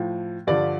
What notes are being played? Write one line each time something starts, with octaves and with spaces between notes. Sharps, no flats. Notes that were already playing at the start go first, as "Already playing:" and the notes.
Already playing: A2 F3
G2 D3 F3 D5